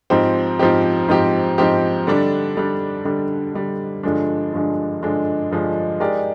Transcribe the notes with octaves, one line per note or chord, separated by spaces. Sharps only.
G#2 F3 C4 G4
G#2 F3 C4 G4
G#2 F3 C4 G4
G#2 F3 C4 G4
D3 G3 D4
D3 G3 D4
D3 G3 D4
D3 G3 D4
G2 D3 F3 G#3 D4
G2 D3 F3 G#3 D4
G2 D3 F3 G#3 D4
G2 D3 F3 G#3 D4
G#3 D#4 G4 A#4 D5